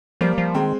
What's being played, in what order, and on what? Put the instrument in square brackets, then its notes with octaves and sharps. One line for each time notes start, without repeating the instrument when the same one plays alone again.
[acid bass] F3 [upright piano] G3 A#3
[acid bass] F3
[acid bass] D#3 [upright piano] G#3 C4